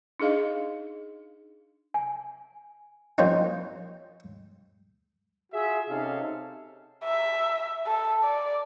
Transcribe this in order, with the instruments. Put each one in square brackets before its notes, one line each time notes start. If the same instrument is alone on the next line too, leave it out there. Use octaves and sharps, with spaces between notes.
[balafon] D4 D#4 G#4 D#5 F5
[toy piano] G#5
[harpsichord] F3 G3 A#3 C4 C#4 D#4
[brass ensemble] F4 F#4 G#4 E5
C3 C#4 D#4 G#4 A4 F5
[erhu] E5
A4
D5